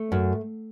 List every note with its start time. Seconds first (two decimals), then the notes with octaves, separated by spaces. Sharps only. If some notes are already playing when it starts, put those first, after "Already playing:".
Already playing: A3
0.12 F#2